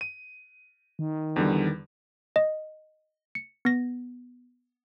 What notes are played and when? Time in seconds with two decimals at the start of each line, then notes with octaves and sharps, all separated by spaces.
0.01 D#7
0.99 D#3
1.36 E2 D3 G3
2.36 D#5
3.35 C#7
3.65 B3 A#6